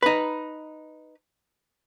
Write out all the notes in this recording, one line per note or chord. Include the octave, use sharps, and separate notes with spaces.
D#4 B4